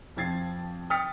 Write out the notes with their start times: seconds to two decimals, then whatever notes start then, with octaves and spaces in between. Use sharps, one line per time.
0.16 F2 F3 C4 G#6 A6 C7
0.90 G5 D#6 F6 A6 B6 C#7